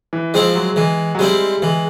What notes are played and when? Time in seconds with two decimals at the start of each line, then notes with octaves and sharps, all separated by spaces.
0.13 E3
0.34 F3 G#3 C4 E4
0.55 F#3
0.76 E3 G#3
1.15 F#3
1.19 G3 G#3 C4 E4
1.62 E3 G#3